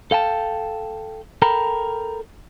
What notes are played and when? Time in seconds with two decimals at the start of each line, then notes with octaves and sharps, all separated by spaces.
0.11 A4 F5 G5 A5
1.42 A4 A#4 G5 A#5 B5